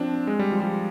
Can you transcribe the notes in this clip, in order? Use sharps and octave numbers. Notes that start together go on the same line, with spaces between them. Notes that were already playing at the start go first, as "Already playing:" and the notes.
Already playing: F3 C4 D4
G#3
G3
F3
G3
F3